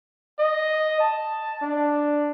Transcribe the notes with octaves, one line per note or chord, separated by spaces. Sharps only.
D#5
A5
D4